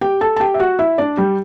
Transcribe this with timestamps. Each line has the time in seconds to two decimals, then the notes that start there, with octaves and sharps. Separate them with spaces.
0.01 G4 G5
0.21 A4 A5
0.36 A5
0.40 G4 G5
0.54 E5
0.59 F#4 F#5
0.79 E4 E5
0.98 D4 D5
1.17 G3 G4